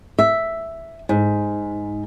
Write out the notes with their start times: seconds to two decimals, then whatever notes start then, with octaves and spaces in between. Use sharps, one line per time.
0.19 E5
1.09 G#2